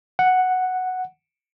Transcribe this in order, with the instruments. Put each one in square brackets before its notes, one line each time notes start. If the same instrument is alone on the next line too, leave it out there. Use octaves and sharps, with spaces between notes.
[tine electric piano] F#5